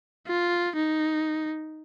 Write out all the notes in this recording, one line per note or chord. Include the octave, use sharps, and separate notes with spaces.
F4
D#4